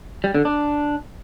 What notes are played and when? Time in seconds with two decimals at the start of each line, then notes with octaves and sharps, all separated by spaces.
0.24 G3
0.35 D3
0.45 D4